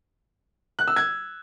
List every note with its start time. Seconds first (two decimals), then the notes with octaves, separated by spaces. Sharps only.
0.79 F#6
0.88 E6
0.96 G#6